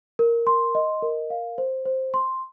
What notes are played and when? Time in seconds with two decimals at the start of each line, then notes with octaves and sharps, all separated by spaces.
0.19 A#4
0.47 C6
0.75 D#5
1.02 A#4
1.30 F5
1.58 C5
1.86 C5
2.14 C6